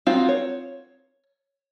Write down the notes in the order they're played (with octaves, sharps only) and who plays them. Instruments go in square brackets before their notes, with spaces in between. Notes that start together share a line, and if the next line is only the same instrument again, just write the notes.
[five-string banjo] C4 D#4 F4 F#4
C#5